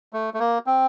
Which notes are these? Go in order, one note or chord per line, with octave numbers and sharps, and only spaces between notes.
A3
A3
A#3
C4